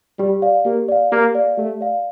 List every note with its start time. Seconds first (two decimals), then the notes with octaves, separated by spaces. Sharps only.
0.19 G3 G4
0.42 D5 F5
0.65 A#3 G4
0.89 D5 F5
1.12 A#3 G4
1.34 D5 F5
1.57 A3 G4
1.81 D5 F5